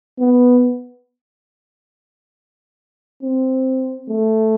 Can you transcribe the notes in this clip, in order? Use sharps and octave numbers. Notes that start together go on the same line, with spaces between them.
B3
C4
A3